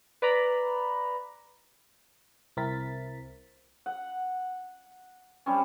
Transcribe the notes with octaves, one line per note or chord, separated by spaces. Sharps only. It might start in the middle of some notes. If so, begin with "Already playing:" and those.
B4 D5 A#5 B5
C2 C4 E4 A#4 A6 B6
F#5
G3 C4 C#4